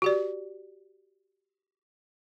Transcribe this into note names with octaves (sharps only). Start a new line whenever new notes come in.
F#4 G4 D5